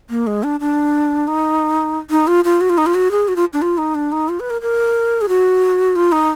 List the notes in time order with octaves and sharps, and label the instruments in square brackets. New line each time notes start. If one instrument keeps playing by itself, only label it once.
[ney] A#3
G#3
D4
D4
D#4
D#4
F4
F4
F#4
F4
D#4
F4
F#4
G#4
F#4
F4
D4
F4
D#4
D4
D#4
F4
B4
A#4
A#4
G#4
F#4
F4
D#4